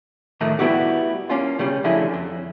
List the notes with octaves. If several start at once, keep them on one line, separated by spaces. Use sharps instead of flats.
A2 D#3 F3 A3 A#3
G3 B3 E4 F#4 G4
A#3 C#4 F4
C#3 G3 C#4
D3 F3 F#3 A3 E4 G#4
F2